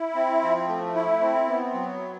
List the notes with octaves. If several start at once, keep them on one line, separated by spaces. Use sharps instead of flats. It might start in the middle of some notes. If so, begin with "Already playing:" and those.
Already playing: E4
C4
F3
A3
E4
C4
B3
F#3